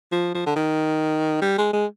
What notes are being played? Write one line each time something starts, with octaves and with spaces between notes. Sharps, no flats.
F3
F3
D3
D#3
G3
G#3
G#3